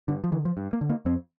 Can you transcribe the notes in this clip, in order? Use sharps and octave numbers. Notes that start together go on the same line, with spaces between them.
G2 D3
F3
D3 E3
F3
G2
A#3
D3
A#3
F2 C4